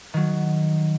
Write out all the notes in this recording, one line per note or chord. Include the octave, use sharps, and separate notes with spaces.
D#3 F#3